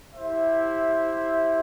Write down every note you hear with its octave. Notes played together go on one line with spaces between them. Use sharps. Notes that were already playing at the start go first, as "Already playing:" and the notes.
E4 G4 C5 E5